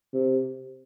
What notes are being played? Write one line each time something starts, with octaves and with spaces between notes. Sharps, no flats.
C3